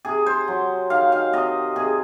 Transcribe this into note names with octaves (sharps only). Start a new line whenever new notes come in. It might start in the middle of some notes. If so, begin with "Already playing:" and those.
C3 G#4
C5
F#3
D#3 F5
F5
C3 D#5
C3 G#4